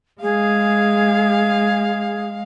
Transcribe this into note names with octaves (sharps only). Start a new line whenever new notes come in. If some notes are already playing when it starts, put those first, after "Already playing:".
G#3 G#4 F5